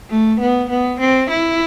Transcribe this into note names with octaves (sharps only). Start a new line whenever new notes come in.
A3
B3
B3
C4
E4